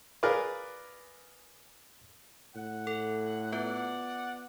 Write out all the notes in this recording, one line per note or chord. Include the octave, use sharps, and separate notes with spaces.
F4 G#4 A#4 B4 D5
A2 F#5
A4
B3 F4 B4 D5 F#5